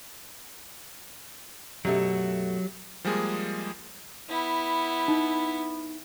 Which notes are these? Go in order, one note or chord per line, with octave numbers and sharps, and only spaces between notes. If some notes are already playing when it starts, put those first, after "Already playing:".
F#2 B2 F#3 A3 G4
F3 G3 G#3 A#3 G#4
B3 E4
D#4